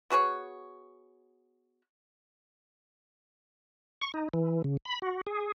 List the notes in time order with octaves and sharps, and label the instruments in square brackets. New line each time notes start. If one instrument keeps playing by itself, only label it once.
[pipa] B3 F#4 G#4 C#5
[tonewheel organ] C#6
D#4
E3
C#3
B5
F#4
G#4